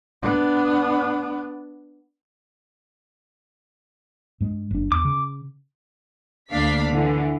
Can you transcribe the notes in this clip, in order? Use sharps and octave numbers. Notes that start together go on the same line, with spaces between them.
B3 D4
G2 G#3
F#1 D4
E2 D6
C#3
D2 A#3 D4 F5 B6
D3 E3